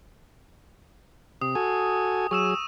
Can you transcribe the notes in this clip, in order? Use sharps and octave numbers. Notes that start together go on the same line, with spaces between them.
C3 D#6
F#4 A4 G#5
F#3 G#4 C#6 E6 E7